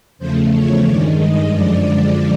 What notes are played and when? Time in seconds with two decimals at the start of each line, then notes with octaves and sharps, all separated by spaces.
0.19 E2 C#3 F3 A3 C5
0.51 C#5
0.84 G2 D#3 G#3 D5
1.18 D#5
1.50 F#2 D3 F3 G#3 D5